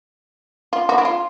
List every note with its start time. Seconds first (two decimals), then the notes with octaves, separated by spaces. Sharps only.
0.73 F4
0.89 F#4
0.98 E4
1.05 F4